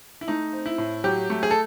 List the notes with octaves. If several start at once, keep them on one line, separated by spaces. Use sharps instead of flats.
E4
A3 D#4
C4
E4
A2
F#3 G4
A3
G#4
A4